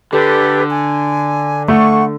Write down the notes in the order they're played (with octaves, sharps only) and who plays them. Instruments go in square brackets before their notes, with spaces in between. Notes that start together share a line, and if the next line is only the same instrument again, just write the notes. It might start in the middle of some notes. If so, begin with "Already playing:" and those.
[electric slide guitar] D3 [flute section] G4 A4 B4
[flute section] G#5
[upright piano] A3 [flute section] F#5 C#6